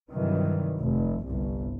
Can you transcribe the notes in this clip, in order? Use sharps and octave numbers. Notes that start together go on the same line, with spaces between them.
G2 C3 D#3 E3 F#3
F1
G1 C2